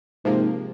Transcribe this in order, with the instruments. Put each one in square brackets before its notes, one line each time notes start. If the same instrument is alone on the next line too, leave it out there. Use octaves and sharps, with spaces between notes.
[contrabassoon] G#2 [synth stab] C3 F3 A#3